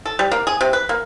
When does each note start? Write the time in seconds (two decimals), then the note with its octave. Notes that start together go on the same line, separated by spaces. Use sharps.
0.05 A4
0.19 G3
0.32 A#3
0.47 G#4
0.61 C3
0.73 B4
0.89 A#3